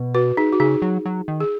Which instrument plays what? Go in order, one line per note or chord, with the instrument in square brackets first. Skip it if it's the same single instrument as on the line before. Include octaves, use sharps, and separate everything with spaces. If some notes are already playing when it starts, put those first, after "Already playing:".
Already playing: [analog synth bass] B2
[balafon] F#4 B4
D#4 G#4
F#4
[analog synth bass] C#3 [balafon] D#4 G#4
[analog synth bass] F#3
F#3
D#3
[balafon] G#4